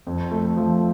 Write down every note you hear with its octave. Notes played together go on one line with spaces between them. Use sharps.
F2
A3
F3